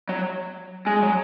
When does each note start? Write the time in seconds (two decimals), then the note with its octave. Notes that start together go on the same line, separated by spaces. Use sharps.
0.09 F#3
0.87 G#3
1.03 F#3